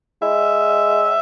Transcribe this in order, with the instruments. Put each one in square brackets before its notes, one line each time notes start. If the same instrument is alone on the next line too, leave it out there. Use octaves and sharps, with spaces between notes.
[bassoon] G#3 [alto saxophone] E5